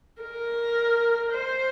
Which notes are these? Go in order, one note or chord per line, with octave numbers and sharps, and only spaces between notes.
A#4
C5